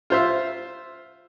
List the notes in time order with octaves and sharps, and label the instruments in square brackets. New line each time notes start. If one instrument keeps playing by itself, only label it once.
[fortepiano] F4 C5 E5